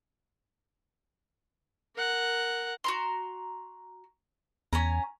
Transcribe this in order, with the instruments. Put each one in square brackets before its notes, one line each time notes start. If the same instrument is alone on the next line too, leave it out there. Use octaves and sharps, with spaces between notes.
[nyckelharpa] A#4 F#5
[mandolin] F#4 A#5 C6
[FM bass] E2 [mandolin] C#4 G#5 A#5